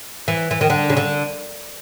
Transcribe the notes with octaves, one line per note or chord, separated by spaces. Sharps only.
E3
E3
D#3
D3
C#3
D3